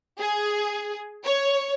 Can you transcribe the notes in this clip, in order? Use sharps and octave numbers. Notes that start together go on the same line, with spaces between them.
G#4
C#5